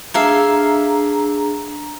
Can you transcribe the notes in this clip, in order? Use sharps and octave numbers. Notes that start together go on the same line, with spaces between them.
D4 G#4 A4 E5 F5 A#5